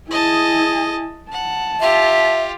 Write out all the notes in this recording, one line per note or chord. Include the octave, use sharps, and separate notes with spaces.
E4 G#4 D#5 A5
F#5 A5
F4 G4 E5